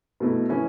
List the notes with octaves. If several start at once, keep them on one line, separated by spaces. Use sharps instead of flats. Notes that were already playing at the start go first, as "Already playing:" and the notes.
B2 A3 E4
E3 C#4 E4